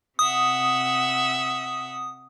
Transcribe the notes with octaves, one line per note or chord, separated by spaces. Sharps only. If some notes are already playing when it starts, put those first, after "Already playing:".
C3 E5 F#5 D#6